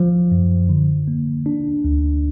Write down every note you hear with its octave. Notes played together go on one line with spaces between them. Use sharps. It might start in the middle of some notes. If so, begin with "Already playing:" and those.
Already playing: F3
F#2
D3
A#3
D4
D2